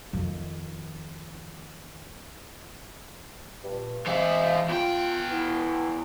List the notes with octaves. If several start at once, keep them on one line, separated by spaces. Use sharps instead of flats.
F2 D#3
G2 A#2
E3 G#3 C4 E5 F5
E2 F4 G5
B3 E4